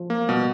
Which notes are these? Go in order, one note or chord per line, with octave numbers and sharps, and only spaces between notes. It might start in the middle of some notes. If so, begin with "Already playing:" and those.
Already playing: F3
A#3
B2 G3